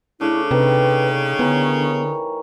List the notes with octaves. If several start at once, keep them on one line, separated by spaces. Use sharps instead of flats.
C#3 A3 D4 E4
C3 D#4 G4 B4
D3 E3 B3 A#4 C#5